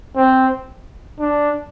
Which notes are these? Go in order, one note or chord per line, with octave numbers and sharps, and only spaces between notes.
C4
D4